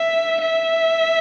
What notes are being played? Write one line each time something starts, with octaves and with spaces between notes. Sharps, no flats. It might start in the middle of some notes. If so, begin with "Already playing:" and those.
Already playing: E5
E5